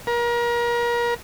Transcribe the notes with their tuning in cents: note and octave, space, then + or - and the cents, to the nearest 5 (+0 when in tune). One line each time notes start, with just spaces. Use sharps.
A#4 +35